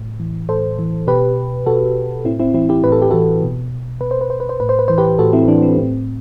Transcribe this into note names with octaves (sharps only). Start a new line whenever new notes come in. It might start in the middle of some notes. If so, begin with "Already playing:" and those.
Already playing: A2
E3
A2 A4 C5
E3
B2 G4 B4
B2 F#4 A4
A2 C4 E4
C4 E4
E3 C4 E4
E4 G4
A2 B4
A4
G4
E3 F#4 A4
B2
B2 B4
C5
B4
C5
B4
C5
A2 B4
C5
B4
E3 C5
G4 B4
A2 F#4 A4
C4 E4
E3 D4
C4
A2 C4